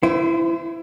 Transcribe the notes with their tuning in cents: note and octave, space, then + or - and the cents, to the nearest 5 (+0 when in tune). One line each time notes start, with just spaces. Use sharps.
E4 +20 C5 -30